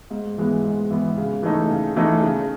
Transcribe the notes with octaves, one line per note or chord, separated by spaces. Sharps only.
G#2
E3 G#3 B3
G#2
E3 G#3 B3
C#3
E3 A3 D#4
C#3
E3 A3 D#4
C#3